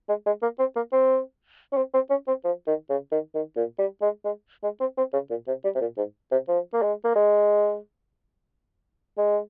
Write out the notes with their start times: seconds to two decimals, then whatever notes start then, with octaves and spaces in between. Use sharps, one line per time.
0.09 G#3
0.26 G#3
0.42 A#3
0.59 C4
0.76 A#3
0.93 C4
1.73 C#4
1.77 C4
1.94 C4
2.10 C#4
2.27 C4
2.44 F3
2.67 D#3
2.90 C#3
3.11 D#3
3.35 D#3
3.56 A#2
3.79 G3
4.02 G#3
4.24 G#3
4.63 G#3
4.80 C4
4.98 C4
5.13 C#3
5.30 A#2
5.47 C3
5.64 G3
5.75 C3
5.81 A#2
5.97 G#2
6.31 C3
6.48 F3
6.73 A#3
6.82 G#3
7.04 A#3
7.15 G#3
9.18 G#3